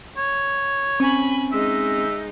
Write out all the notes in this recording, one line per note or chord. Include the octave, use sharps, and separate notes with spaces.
C#5
C4 C#4 G#5 B5 C#6
G#3 D#4 E5